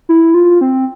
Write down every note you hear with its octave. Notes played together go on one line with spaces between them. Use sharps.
E4
F4
C4